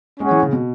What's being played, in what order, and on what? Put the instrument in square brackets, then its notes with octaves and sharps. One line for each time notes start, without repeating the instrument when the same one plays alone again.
[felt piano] G#3 [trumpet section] C#4 G#4 C#5 F#5
[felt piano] E3
C#3
B2